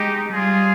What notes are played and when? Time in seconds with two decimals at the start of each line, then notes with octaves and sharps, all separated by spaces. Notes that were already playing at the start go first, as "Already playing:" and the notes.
Already playing: G#3 D#4 G4
0.31 G3 F4 G#4